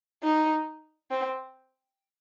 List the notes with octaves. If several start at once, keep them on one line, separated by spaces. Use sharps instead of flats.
D#4
C4